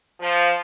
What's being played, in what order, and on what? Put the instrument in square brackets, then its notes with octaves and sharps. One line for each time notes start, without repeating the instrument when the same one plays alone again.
[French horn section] F3